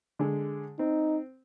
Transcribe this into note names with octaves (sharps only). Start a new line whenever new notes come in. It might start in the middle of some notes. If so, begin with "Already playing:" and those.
D3 G#3
C4 D#4